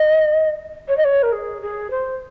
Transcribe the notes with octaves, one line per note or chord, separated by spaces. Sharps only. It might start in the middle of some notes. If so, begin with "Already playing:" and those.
Already playing: D#5
C#5
D#5
C#5
A#4
G#4
G#4
C5